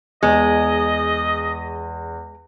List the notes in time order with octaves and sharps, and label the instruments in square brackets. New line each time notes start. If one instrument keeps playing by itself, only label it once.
[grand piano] E2 [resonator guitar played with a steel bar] G#3 [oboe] D#5